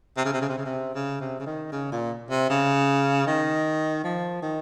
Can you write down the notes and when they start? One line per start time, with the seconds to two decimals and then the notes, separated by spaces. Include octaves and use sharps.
0.17 C3
0.25 C#3
0.33 C3
0.42 C#3
0.49 C3
0.58 C#3
0.66 C3
0.95 C#3
1.21 C3
1.39 C#3
1.46 D#3
1.72 C#3
1.92 A#2
2.30 C3
2.50 C#3
3.27 D#3
4.04 F3
4.42 D#3